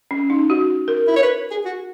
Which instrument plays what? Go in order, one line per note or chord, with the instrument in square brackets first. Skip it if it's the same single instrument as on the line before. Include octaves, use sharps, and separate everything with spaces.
[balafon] C#4
D#4
F#4
A#4
[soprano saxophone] E4
C#5
B4
G#4
F#4